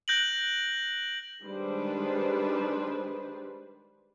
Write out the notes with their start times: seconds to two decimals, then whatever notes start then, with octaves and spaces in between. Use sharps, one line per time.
0.08 F#6 G6 A#6 D7 F#7
1.43 D#3 G3 G#3 D4 B4 C5